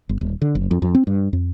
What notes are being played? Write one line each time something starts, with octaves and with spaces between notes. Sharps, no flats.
G1
D#1
D3
F#1
F2
F2
C4
G2
F2